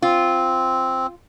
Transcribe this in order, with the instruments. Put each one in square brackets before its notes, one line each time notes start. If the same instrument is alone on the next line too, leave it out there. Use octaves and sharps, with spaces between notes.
[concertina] C4 [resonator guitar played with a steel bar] F4